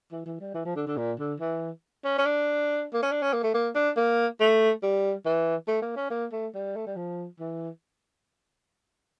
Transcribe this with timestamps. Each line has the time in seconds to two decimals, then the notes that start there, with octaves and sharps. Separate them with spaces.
0.12 E3
0.26 E3
0.40 G3
0.54 E3
0.65 F3
0.76 D3
0.87 D3
0.97 A#2
1.19 D3
1.40 E3
2.05 C#4
2.18 C#4
2.26 D4
2.94 A#3
3.03 C#4
3.12 D4
3.22 C#4
3.33 A#3
3.44 A3
3.54 A#3
3.75 D4
3.97 A#3
4.40 A3
4.83 G3
5.26 E3
5.68 A3
5.82 A#3
5.96 C#4
6.10 A#3
6.32 A3
6.54 G3
6.76 A3
6.87 G3
6.96 F3
7.40 E3